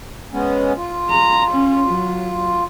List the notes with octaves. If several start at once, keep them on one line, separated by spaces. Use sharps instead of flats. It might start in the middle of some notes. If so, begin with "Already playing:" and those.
G#3 B3 C#4
F4
A#5
C#4
F#3